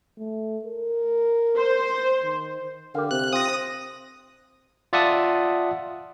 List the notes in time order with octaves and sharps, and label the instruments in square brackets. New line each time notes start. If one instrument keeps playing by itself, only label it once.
[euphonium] A3
A#4
[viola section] C5
[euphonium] D#3
[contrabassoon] D3 [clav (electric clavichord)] G4 F5 [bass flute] A#4
[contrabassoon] C3 [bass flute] C5 [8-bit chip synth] F#6
[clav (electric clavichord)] C4 F4 [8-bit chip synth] D#6 A#6
[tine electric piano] F4 D5 E5 F#5 A5 D#6